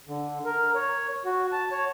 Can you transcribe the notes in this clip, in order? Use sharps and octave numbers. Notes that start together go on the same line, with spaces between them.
D3
A#4
C#5
F#4
A5
C#5